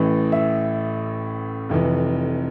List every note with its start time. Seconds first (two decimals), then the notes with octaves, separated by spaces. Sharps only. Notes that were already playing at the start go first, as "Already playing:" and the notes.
Already playing: A1 A2 E3
0.32 E5
1.69 F1 F2 E3